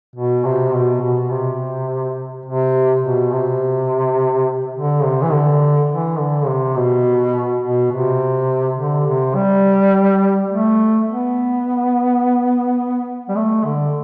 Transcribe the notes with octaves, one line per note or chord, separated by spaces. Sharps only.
B2
C3
B2
B2
C3
C3
B2
C3
D3
C3
E3
D3
E3
D3
C3
B2
B2
C3
D3
C3
G3
A3
B3
G3
A3
D3